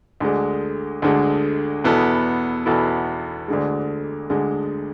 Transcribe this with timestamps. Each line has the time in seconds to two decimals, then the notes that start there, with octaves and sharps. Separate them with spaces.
0.20 D2 D3 G#3
1.02 D2 D3 G#3
1.84 E2 B2 B3 E4 A4
2.66 E2 B2 B3 E4 A4
3.48 D2 D3 G#3
4.30 D2 D3 G#3